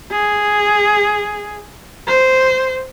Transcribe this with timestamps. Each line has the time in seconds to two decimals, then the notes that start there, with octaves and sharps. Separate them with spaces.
0.11 G#4
2.07 C5